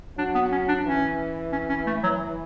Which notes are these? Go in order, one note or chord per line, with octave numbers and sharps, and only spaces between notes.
F#3 D4
B3
C#4
D4
E3 C#4
C#4
C#4
A3
F#3